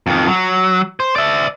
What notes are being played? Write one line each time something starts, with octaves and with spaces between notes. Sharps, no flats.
F2 D#3
F#3
C5
D5 E5